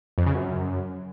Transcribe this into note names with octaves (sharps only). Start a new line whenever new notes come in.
F2
C#3
F#2